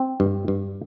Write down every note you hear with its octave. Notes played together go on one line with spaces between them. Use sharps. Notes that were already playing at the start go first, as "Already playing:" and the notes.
Already playing: C4
G2
G2